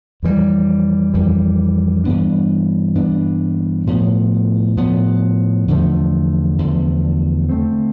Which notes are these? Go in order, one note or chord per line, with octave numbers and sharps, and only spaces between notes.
F2 E3 G3
F2 E3 G3
G2 E3 B3 D4
G2 E3 B3 D4
A2 F3 B3
A2 F3 B3
E2 D3 F3 A3
E2 D3 F3 A3
D3 A3 C4